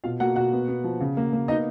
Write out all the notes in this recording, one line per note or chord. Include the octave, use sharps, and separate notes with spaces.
B2 F4 F5
A#3 F#4 F#5
B2 F#4 F#5
B3
B3
F3
C#3
A#3
A#3
B3 D#4 D#5